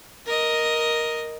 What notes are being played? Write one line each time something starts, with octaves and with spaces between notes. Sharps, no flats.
A#4 D#5